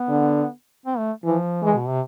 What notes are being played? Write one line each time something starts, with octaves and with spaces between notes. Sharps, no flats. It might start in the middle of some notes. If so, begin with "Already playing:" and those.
Already playing: B3
D3
C4
A3
E3 F3
E3 G#3
B2
C3